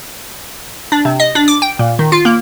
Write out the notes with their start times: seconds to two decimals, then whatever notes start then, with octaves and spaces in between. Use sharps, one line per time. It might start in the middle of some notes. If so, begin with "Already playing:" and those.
0.92 D4
1.05 C3
1.20 D#5
1.35 D4
1.48 D6
1.62 G5
1.79 A#2
1.99 D#3
2.12 F4
2.25 A#3